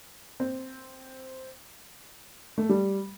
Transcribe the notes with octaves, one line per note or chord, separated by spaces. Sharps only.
C4
A3
G3